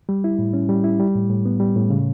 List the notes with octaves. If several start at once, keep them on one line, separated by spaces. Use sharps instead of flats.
G3
E4
A2
C#4
G3
E4
G3
A2
A2
B3
G3
A2
C#3